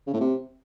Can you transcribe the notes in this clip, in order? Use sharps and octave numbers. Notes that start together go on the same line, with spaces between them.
C#3
A2
C3